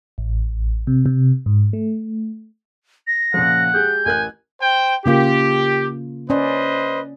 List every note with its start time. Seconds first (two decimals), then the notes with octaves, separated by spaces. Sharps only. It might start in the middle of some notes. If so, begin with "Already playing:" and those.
0.18 A1
0.87 C3
1.06 C3
1.46 G#2
1.73 A3
3.07 A#6
3.34 A#2 C#3 F3 F#5
3.73 G#3 G4 G#4 G6
4.06 A1 A#4 G#5 F#6
4.61 C5 G5
5.06 C#3 A#3 F4 G4
6.30 C#4 B4 C5 D5 D#5